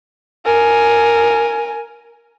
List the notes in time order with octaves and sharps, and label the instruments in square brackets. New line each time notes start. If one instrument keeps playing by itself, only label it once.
[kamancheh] A#4 G#5